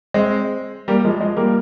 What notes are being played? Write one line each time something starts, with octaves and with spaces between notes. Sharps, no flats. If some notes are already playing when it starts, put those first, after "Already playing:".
G#3 C4
G3 A#3
F3 G#3
F3 G#3
G3 A#3